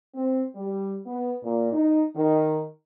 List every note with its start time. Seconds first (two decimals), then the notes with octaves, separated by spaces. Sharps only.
0.15 C4
0.56 G3
1.06 B3
1.43 A#2
1.73 D#4
2.15 D#3